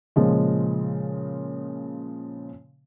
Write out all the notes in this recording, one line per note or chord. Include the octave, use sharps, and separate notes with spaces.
A#2 C#3 F3 G#3